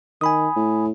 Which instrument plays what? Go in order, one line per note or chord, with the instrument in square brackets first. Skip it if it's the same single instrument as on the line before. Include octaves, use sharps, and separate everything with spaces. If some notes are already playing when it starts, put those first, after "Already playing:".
[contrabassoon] D#3 [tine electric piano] G#5 B5 D#6
[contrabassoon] A2